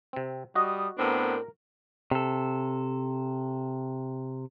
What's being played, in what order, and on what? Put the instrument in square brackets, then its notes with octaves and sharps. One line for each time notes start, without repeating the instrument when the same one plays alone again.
[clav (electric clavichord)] C3 C4
[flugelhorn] G3 [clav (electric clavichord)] F#4 D#5 [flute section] D#6
[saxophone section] A2 C4 D4 [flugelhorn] B3 [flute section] A#4
[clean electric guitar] C3 A4